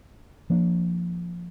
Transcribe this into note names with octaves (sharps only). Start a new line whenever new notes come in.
F3 A#3 D4